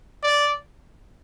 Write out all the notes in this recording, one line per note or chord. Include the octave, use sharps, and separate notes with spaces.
D5